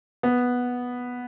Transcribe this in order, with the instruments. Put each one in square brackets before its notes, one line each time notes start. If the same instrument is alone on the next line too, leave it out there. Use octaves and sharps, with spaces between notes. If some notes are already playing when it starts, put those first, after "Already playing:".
[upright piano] B3